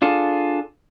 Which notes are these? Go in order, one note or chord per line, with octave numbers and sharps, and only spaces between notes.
D4 F4 G#4 A4